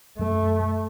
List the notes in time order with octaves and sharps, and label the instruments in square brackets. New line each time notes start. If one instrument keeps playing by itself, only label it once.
[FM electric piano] F#2 [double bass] A3